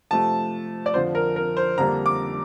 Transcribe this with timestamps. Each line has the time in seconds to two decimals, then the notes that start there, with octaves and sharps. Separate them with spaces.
0.11 C3 F3 A3 A5
0.86 D5
0.94 F2 D3 F3 C5
1.15 A#4
1.36 A#4
1.57 C5
1.78 F2 D3 G3 A#3 D4 A#5
2.06 D6